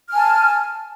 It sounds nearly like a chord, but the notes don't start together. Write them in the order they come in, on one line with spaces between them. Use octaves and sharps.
F6 G#5 A5